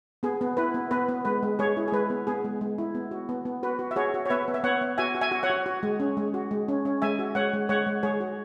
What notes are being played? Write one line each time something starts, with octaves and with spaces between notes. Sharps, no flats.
B3 G#4
B3
E4 B4
B3
B3 B4
B3
G#3 B4
G#3
G#3 G#4 C#5
E4
G#4
G#3 B4
B3
B3 G#4
G#3
G#3
E4
B3
F#4
B3
B3
F#4 B4
F#4
E5
F#4 G#4 C#5
F#4
C#5
B3 B4 E5
B3
E5
B3 C#5 F#5
B3
F#4 E5 G#5
F#4
E5 G#5
F#4
C#5 F#5
F#4
F#4
G#3
C#4
G#3
F#4
G#3
C#4
C#4
G#3 E5 G#5
F#4
G#3 C#5 F#5
G#3
G#3 C#5 F#5
G#3
G#3 G#4 C#5
F#4